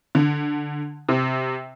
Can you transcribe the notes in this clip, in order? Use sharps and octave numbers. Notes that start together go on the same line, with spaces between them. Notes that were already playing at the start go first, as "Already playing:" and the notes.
D3
C3